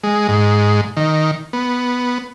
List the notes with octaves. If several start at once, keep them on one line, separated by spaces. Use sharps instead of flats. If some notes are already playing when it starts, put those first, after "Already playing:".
G#3
G#2
D#3
B3